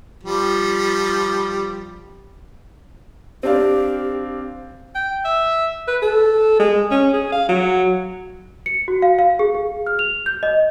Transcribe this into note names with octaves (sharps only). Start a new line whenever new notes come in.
F3 G3
C4 D4 G4 F5
G5
E5
B4
A4
G#3
C#4
G#4
F5
F#3
C#7
F#4
F5
F5
G#4
G#4
F6
F7
G6
D#5